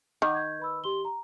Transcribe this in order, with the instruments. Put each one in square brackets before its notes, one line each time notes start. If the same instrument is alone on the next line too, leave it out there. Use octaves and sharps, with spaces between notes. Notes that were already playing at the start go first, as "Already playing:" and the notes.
[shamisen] D#3 [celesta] F#5 D6 G6
[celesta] G6 G#6
B4 B5 E6
G4 C6 G7
A#5